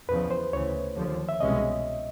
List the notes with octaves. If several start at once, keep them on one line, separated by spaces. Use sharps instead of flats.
E2 C#3 F3 B4
C5
D2 C#3 E3 C#5
D#2 D3 F3
E5
C2 B2 G#3 C#4 D#5